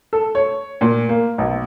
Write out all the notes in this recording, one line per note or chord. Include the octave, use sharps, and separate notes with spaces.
A4
C#5
A#2
A#3
B1